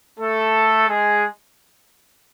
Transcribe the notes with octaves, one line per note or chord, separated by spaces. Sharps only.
A3 A4
G#3 G#4